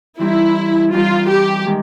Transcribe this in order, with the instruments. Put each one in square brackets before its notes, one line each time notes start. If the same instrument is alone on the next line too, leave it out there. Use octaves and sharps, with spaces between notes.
[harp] E3 G3 C4 D#4 [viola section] E4
[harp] E3 G3 C4 D#4 [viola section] F4
[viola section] G4
[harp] D#3 G#3 C4